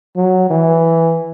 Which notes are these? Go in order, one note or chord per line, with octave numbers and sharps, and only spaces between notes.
F#3
E3